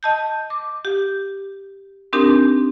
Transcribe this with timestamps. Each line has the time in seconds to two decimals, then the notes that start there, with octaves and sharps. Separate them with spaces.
0.03 D#5 A5 G6
0.50 D6
0.85 G4
2.13 C4 D4 D#4 G4 A#4